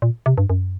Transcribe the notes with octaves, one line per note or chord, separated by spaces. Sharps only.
A#2
C3
G2
F#2